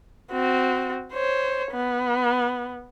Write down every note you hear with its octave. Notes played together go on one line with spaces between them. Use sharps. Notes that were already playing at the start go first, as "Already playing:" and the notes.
C4 F#4
C5 C#5
B3